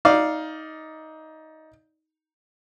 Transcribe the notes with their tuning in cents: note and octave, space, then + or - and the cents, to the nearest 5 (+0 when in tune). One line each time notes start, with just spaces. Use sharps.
D#4 +15 D5 +0 F5 +0